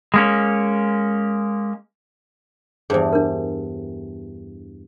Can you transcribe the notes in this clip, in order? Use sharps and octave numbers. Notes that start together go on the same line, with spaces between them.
G#3 A#3 C#4
E2 G2 G#4 C5
D4 A#4